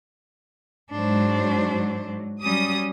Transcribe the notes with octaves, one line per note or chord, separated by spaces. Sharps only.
G#2 F#3 D4 C5
F#3 G3 C#4 D#6